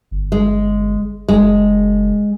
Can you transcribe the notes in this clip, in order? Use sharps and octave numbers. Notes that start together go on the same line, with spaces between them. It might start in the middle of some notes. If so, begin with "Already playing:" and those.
G1
G#3
F#1 G#3